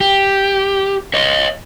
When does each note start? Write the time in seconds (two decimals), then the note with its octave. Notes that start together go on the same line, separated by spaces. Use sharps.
0.01 G4
1.14 C#5 D#5